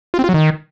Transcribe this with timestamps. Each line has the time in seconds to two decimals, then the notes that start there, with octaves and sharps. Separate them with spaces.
0.14 F4
0.19 C4
0.24 F4
0.29 F#3
0.34 D#3